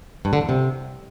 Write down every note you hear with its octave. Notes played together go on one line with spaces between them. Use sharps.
G2
D3
E2
C3